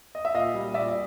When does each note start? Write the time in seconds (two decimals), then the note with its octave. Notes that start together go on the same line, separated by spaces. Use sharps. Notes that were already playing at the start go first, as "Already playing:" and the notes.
0.15 D#5
0.25 E5
0.34 A#2 D#5 F5
0.54 G3
0.74 A#2 D5 E5
0.89 E5